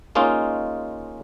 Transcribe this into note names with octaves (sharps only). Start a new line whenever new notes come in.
G#3 A#3 C#4 D#4 F4